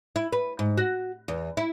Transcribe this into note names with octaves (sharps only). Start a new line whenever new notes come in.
E4
B4
G#2
F#4
E2
E4